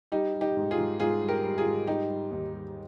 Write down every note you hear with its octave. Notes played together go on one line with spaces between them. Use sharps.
G3 D#4 G4
G3
D#4 G4
G#2
F4 G#4
G#2
G#2 F4 G#4
G3
G4 A#4
G3
F4 G#4
G#2
G3 D#4 G4
G3
D#2
G3